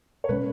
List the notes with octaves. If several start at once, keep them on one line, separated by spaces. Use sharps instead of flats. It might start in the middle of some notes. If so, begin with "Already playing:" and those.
C#5
B2 G#3 C#4 B4